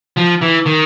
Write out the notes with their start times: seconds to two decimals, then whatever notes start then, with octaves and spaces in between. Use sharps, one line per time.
0.17 F3
0.41 E3
0.66 D#3